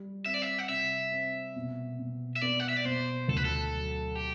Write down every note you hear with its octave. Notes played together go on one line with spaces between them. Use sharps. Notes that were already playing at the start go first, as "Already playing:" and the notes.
Already playing: G3
C4 E5
D5
E5
F#5
C3 E5
C4
B2
B2
E5
B3 D5
F#5
E5
D5
B2 C5
D2 A4
B4
A4
F#3
G4